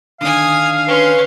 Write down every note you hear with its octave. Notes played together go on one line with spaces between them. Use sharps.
D3 D#3 D4 F5 G#5 D#6
C#4 B4 C6